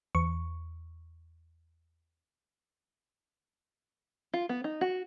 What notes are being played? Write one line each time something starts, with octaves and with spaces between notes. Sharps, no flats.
E2 C#6
F4
B3
D#4
F#4